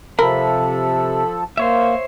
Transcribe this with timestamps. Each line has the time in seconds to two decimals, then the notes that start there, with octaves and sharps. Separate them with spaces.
0.19 C3 F3 A4 A#4 B5
1.57 A#3 C5 C#5 E5